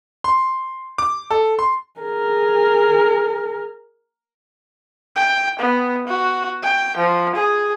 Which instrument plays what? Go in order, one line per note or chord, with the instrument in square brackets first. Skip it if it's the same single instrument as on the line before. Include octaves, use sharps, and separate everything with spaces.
[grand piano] C6
D6
A4
C6
[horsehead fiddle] G#4 A#4
[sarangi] G5
B3
F#4
G5
F3
G#4